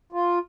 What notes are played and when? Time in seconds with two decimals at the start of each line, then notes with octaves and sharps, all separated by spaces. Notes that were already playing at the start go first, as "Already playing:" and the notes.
0.13 F4